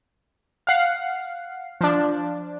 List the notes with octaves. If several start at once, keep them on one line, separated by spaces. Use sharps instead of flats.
F5 F#5 C7
F3 D4